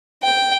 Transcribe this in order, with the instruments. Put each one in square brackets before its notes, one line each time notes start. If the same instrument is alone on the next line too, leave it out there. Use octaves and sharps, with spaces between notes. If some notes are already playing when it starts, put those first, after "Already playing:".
[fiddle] G5